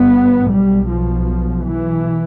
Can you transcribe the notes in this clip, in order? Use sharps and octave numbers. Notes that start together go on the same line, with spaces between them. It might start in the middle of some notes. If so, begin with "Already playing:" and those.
Already playing: G1 G2 B3
B1 B2 G3
F3
E3